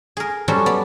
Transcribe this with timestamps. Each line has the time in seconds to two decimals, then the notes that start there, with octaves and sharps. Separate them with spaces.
0.17 G#4 A#4
0.48 F#3 G3 C#4 F#4 A4 C5
0.66 B3 D5 B5